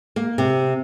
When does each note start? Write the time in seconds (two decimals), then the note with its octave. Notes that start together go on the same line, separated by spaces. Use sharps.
0.16 A#3
0.38 C3